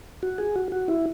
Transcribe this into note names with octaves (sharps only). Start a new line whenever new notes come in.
F#4
G#4
F#4
F#4
E4